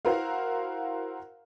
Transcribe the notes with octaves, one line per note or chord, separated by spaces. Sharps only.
E4 F#4 A#4 C5 F5